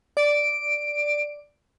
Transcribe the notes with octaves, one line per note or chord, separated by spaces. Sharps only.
D5 D7